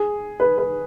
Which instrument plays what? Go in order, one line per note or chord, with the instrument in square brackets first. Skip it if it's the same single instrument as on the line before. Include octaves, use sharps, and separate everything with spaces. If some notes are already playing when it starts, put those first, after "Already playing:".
Already playing: [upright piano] G#4
B4
B4